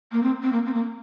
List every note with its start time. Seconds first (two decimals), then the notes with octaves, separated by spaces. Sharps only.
0.12 A#3
0.23 C4
0.42 C4
0.52 A#3
0.65 C4
0.74 A#3